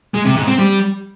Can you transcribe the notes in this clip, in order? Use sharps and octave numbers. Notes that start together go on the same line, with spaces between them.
G#3
C3
G#2
C4
G3